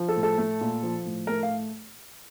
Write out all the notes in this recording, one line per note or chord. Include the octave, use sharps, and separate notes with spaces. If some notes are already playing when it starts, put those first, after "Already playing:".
Already playing: F3
A4
A2
A4
A3
A#2
F3
A2
A3 A#4
F5